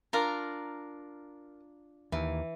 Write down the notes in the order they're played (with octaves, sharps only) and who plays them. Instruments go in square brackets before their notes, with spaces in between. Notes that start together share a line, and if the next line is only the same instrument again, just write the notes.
[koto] D4 F4 A#5 [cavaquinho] A#4
[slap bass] D#2 [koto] E3